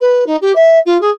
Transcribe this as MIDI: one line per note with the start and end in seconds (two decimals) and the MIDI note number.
0.01 0.25 71
0.27 0.36 63
0.42 0.52 67
0.56 0.79 76
0.86 1.00 65
1.01 1.11 68